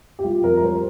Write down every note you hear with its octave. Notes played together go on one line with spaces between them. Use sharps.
G4
G3 F4
F2 A#4
A#4
G3 C5